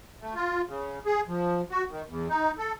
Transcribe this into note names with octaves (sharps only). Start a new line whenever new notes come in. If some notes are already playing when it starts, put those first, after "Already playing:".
A3
F4
C#3
G#4
F3
F#4
D#3
E2
D#4
A4